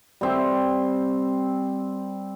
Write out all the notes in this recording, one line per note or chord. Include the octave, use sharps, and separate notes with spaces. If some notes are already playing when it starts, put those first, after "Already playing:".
G3 C4